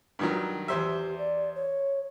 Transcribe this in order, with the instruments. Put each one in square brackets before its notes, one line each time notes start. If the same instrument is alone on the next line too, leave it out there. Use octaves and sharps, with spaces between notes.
[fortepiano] G2 D#3 F#3
[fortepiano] E2 C5 E5 [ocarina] G4
[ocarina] D5
C#5